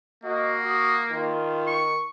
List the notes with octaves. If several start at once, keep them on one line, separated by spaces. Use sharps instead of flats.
A#3 F#4 D#5
F#4 D#6
D#3 F4
C#6